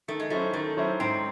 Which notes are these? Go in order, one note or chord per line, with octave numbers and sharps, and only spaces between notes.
D#3 A3
G#3
F#3 A3 C#4 E4 C5
D#3 A3
F#3 C#4 E4 C5
G#2 C4